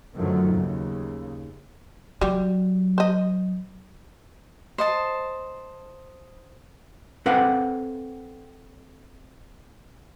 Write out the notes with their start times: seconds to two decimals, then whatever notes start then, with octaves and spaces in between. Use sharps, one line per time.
0.14 F#2 D3 D#3 F3 F#3 A3
0.54 D#2 C#3
2.21 F#3 G3
2.98 C5 D#5
4.78 C5 D#5 A5
7.26 C4 A4 B4 D5 F5 F#5